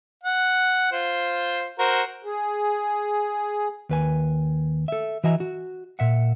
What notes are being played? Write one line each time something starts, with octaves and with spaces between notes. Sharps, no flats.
F#5
F4 C5
F#4 A#4 C5
G#4
D#2 B4 G#5
A4 E5
E3 F#4 D#5 E5 G#5 A#5
F#4
A#2 E5 F#5